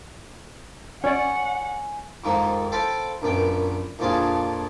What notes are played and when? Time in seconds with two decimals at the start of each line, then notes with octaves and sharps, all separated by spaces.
1.04 C#4 C#5 D5 F#5 G#5
2.24 F2 G#2 D#3 A#3 D#4
2.72 A4 C5 F5 G5 B5
3.22 A#1 F#2 B3 G5
3.99 A#1 F2 F3 D4 G#4 F5